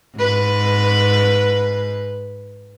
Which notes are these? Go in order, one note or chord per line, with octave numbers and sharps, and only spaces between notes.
G#2 B4